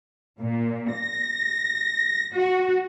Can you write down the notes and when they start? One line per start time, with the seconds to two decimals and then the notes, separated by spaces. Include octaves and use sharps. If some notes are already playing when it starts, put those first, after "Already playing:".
0.40 A#2
0.95 A#6
2.35 F#4